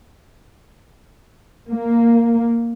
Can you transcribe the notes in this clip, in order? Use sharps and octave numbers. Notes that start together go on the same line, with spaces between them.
A#3